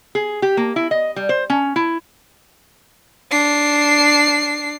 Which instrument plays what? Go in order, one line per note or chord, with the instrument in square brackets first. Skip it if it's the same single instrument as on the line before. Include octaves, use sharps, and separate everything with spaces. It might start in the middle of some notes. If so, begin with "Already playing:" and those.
[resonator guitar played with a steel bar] G#4
G4
A#3
E4
D#5
G3
C5
C#4
E4
[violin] D4 C7